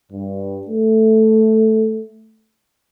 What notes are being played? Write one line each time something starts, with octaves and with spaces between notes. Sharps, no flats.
G2
A3